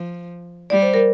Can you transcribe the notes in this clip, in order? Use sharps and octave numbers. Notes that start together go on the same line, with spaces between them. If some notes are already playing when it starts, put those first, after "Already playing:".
Already playing: F3
G3 D5
C5
A#4